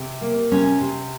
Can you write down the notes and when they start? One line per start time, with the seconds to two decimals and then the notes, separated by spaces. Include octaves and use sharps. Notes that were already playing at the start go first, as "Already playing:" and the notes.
Already playing: C3
0.21 A#3
0.51 C3 C#4
0.81 C3